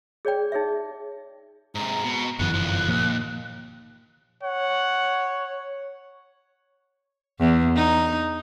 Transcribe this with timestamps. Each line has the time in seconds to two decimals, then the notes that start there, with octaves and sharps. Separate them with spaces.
0.25 G#4 C#5 D5 G5
0.52 D#4 G#4 C#5 E5
1.75 G#2 C3 A#5
2.04 B2
2.39 G1 F#2 C#3 E3 B3 F#6
2.54 C2 F3
2.87 D#2 A#2 F3 A#3
4.43 C#5 F#5
7.40 E2
7.76 D#4